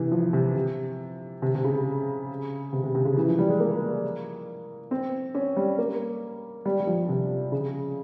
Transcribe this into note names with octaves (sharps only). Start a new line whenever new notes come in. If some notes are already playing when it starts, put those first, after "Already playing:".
Already playing: C3 E3
F3
C3
C3
C3
C3
C#3
C3
C3
C3
C#3
E3
F3
G3
G#3
A#3
C4
C#4
G3
A#3
G3
G3
F3
C3
C#3